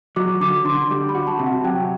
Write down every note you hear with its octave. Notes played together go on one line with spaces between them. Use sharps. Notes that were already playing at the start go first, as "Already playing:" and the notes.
F#3 D6
D3 D6
D3 C6
G3 D6
B5
F#4
A5
C3
F#5
F#3 G5